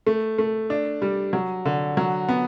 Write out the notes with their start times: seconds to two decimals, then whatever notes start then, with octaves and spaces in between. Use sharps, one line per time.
0.06 A3
0.38 A3
0.70 D4
1.02 G3
1.33 F#3
1.65 D3
1.97 F#3
2.29 B3